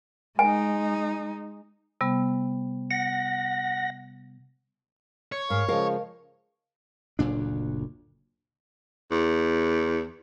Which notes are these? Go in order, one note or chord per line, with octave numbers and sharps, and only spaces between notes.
G#3 D#4 G#5
C3 G3 B3
F#5 A#6
C#5
G#2 A#4 F5
C#3 F3 G#3 A#4 F5
F#1 D2 A#2 D4
E2